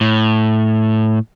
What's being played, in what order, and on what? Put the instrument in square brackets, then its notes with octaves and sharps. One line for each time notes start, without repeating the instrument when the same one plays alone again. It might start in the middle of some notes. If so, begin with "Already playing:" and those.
[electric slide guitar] A2